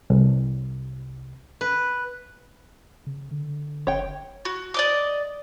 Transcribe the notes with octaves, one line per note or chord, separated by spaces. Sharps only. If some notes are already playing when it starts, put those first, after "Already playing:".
C2
B4
C#3
D3
F#1 C#5 G5
F#4
D5 D#5 D6